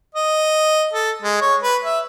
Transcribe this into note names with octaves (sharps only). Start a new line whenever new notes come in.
D#5
A4
G#3
C#5
B4
E5